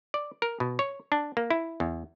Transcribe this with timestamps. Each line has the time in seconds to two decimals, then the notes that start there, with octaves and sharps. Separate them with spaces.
0.14 D5
0.42 A#4
0.60 B2
0.79 C#5
1.12 D4
1.37 A#3
1.50 E4
1.80 E2